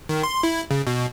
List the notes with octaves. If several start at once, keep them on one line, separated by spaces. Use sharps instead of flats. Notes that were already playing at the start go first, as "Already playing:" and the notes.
D#3
C6
E4
C#3
B2